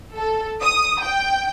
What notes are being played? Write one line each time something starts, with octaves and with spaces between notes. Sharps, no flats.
A4
D#6
G5